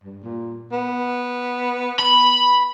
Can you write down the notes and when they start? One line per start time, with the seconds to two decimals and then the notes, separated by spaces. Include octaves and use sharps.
0.04 G2
0.23 A#2
0.72 B3
1.99 B5